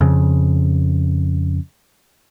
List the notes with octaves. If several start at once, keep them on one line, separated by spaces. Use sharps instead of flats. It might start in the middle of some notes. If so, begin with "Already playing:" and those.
F2 C#3